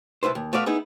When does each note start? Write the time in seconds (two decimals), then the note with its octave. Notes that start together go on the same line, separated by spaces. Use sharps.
0.23 C2 E4 B4 C5
0.35 D#2
0.53 A3 B3 F#4 D5 F5
0.66 B3 D#4 E4 G#4